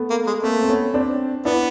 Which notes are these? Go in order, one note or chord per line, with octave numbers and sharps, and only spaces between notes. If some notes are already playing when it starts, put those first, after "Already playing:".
Already playing: A3 B3
A#3
G#3
A3 A#3 C4
C4
B3 C#4
C4 D4
B3 D4 E4